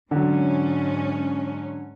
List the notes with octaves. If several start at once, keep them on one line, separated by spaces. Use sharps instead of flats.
G#2 D3 F#3 C#4